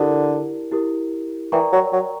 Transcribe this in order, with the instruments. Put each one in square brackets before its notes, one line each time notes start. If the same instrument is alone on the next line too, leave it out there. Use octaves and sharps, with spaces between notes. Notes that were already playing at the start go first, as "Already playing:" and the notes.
Already playing: [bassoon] D3 [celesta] E4 G4 A#4
[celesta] E4 G4 A#4
[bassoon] E3 [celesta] A#4 D5 G5 A#5 C#6
[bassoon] F#3
F#3